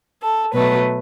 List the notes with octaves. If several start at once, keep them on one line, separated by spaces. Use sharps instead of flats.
A4
B2 F#3 A3 B4